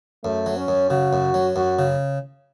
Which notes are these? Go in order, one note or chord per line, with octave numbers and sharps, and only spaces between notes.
F#2 A3
F#3
C#4
F#2
C#3 F#4
F#2
F#3
F#2 F#4
C#3